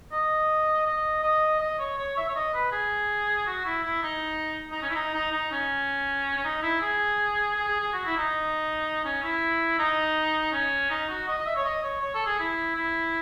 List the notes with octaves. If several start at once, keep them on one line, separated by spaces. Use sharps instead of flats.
D#5
D#5
D#5
D#5
C#5
C#5
E5
C#5
D#5
B4
G#4
F#4
E4
E4
D#4
D#4
C#4
E4
D#4
D#4
D#4
C#4
C#4
D#4
E4
G#4
G#4
G#4
G#4
F#4
E4
D#4
C#4
E4
D#4
C#4
D#4
F#4
D#5
D#5
E5
C#5
D#5
C#5
C#5
A4
G#4
E4
E4